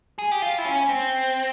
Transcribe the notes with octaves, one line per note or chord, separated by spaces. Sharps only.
G#4
G4
F4
E4
C#4
C4